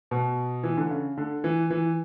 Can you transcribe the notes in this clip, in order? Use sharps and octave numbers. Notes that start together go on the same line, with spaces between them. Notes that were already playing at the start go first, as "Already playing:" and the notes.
B2
E3
D3
C#3
D3
E3
E3